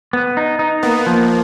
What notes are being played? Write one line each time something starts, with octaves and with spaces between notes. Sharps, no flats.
B3
D#4
D#4
A#3 B3
F3